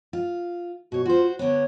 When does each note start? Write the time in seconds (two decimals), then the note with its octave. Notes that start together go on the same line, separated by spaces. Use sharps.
0.13 F4
0.92 B2 F#4 C#5
1.05 F4 F#4 C5
1.39 D3 B3 C#5